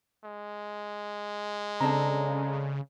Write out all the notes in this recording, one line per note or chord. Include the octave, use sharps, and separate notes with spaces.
G#3
C#3 C4 D4 A4 A#5